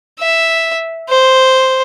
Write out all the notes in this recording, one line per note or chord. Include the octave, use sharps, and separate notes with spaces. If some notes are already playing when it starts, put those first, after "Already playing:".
E5
C5